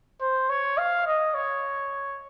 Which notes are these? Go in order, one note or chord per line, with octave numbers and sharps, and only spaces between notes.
C5
C#5
F5
D#5
C#5